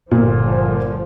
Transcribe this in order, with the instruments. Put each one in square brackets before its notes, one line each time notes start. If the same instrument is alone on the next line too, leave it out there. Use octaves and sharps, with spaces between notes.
[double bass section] G1 D3 F3 [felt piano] A#2